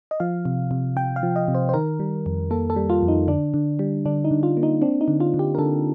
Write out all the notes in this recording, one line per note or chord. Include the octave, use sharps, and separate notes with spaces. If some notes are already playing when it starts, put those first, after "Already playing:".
D#5
F3 F5
C3
C3
C3 G5
F5
F3
D#5
C3
C5
C5
D#3 A#4
G3
F2
A#3 A4
A4
G3
F4
F2
D#4
D3 D4
D3
G3
D3 D4
D#4
D3
F4
A#3
D#4
C4 D4
D#4
D3
F4
D3
G4
A#4
D3 A4